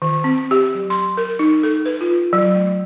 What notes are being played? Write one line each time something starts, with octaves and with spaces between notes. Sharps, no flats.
D#3
C4
G4
F#3
C6
A#4
D#4
A4
B4
F4
F#3
A3